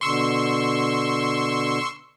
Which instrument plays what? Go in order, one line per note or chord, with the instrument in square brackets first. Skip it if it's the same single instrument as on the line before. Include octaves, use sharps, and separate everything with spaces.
[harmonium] B2 D3 [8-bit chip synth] C6 C#6 E6